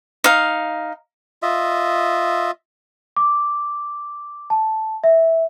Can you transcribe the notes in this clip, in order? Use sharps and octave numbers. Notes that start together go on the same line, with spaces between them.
D#4 F5
F4 D#5 E5
D6
A5
E5